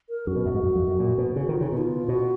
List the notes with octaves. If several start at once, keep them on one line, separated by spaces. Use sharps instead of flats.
A#4
F#2 F#4
B2
F#2
G#2
F#2
F2
F#2
A#2
B2
C#3 F#4
D#3 F4
C#3 D#4
B2
F4
B2 F#4